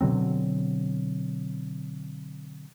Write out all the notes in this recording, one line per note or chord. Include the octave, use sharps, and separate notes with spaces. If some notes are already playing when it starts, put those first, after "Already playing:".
B2 D3 F#3 C4